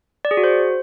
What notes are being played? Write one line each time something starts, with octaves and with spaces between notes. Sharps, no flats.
D5
G#4
F#4
C5